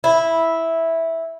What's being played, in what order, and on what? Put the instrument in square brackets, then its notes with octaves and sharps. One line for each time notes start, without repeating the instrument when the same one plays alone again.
[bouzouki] E4